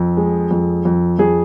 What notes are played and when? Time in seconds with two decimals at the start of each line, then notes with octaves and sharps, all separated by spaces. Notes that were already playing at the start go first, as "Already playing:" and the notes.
Already playing: F2
0.17 G#3
0.51 F2
0.85 F2
1.19 F2 G#4